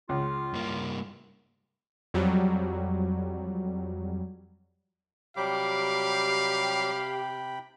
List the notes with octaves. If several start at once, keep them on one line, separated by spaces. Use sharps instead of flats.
C#2 F4
G2 A#3
F2 F#3 G3
C3 F#3 G3 G4 F5 G5 B5 D6